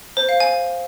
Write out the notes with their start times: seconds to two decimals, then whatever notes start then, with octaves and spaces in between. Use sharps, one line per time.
0.17 C5
0.29 F5
0.40 G#5